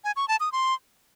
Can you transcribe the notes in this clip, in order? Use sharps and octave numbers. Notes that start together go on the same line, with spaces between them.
G#5
C#6
A5
D#6
C6